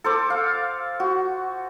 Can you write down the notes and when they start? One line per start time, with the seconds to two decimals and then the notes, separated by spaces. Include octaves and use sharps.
0.04 A4 C5 D6
0.30 F5
1.00 F#4